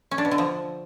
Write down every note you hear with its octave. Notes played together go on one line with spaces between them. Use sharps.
C#4
D4
B2
D3
F3